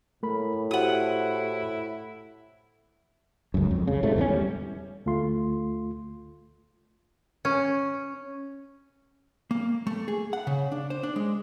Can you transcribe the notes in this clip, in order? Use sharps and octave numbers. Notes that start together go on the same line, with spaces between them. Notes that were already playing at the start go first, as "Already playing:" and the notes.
A2 A3 A#4 B5
E4 F#4 G4 C5 F#5 D#6
C#2 F#2
F2
C#3
G#2 C3 A3
E2 E3 A#3 C#4
G3
D2 A3 F4 C6
C#4
A#3
A3
G#4
F#5
C#3
D4
C5
D4
G#3